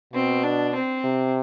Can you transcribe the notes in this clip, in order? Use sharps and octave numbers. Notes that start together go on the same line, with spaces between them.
B2 C4
D4
C4
C3